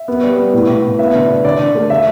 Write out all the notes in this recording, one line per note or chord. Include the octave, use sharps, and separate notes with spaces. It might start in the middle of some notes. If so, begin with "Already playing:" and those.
Already playing: E5
B3
G3
B3
A2
A2
A2
B3 E5
D3
D3
D3 D5
D3
A3
D3 E5